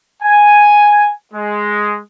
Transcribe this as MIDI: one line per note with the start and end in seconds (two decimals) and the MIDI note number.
0.23 1.12 80
1.34 1.99 56